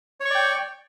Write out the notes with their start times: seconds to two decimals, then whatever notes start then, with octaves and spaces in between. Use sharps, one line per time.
0.20 C#5
0.25 C#6
0.30 D5
0.35 G5